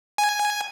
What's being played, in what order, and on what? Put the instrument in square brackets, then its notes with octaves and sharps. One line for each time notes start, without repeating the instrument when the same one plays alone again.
[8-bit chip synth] G#5